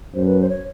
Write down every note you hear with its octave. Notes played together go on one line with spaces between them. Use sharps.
F#2 C5
B4
C5
C#5